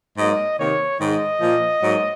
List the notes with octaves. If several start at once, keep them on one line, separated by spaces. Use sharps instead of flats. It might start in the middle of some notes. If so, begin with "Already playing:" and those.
G#2 F#3 A#3 D#5
C3 D#3 A#3 C#5
G#2 D#3 G#3 D#5
A#2 F3 A#3
G#2 F#3 A#3